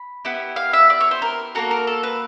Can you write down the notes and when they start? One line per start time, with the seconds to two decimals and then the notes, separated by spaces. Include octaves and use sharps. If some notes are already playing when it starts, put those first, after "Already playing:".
Already playing: B5
0.25 B3 E4 G4
0.56 F5
0.73 E5
0.90 D5
1.00 C#5
1.11 C5
1.22 A#4
1.55 A#3 C#4 F#4 A4 A#4
1.71 A#4
1.87 A4
2.03 B4